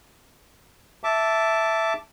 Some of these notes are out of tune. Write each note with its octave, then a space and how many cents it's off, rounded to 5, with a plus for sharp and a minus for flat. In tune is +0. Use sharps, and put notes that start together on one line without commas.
E5 +0 A5 +0 D6 -15